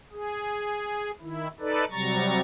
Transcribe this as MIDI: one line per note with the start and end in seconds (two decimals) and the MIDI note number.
0.12 1.11 68
1.21 1.48 51
1.21 1.48 64
1.60 1.85 63
1.60 1.85 69
1.60 1.85 71
1.60 1.85 74
1.91 2.41 48
1.91 2.41 54
1.91 2.41 55
1.91 2.41 82
1.91 2.41 85
1.91 2.41 93